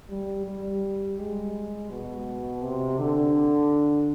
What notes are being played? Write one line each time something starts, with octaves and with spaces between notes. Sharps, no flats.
G3
G3
G#3
B2
C3
D3